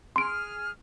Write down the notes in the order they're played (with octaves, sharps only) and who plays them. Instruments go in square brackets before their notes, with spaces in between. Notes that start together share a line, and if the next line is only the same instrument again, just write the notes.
[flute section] G#4 F6 [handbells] C6 D7